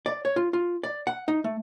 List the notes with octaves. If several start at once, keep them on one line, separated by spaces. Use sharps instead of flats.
D5
C#5
F4
F4
D5
F#5
D#4
A3